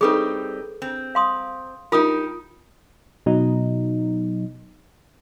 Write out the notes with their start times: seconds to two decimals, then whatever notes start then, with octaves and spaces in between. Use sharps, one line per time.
0.01 G3 C4 D#4 G#4 A4 B4
0.82 C4
1.15 F5 C6 D#6
1.92 D#4 F4 G4 A#4 D#6
3.26 B2 F#3 D#4